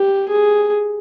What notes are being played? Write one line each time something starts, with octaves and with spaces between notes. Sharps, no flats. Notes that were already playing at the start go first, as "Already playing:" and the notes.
Already playing: G4
G#4